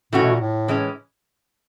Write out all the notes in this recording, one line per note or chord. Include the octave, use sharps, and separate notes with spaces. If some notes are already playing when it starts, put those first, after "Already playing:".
A2 E3 A3 C#4 F#4
B2
A#2
A2
E3 G#3 C#4